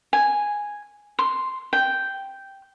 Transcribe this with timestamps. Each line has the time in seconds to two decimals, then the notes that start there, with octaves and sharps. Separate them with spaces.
0.13 G#5
1.19 C6
1.73 G5